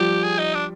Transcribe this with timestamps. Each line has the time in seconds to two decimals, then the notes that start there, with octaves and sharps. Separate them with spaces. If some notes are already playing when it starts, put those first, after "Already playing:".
Already playing: F3 G3 G4
0.23 G#4
0.39 D#4
0.54 D4